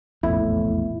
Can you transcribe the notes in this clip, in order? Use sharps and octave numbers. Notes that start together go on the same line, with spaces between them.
F1 A#1 E2 A2 E4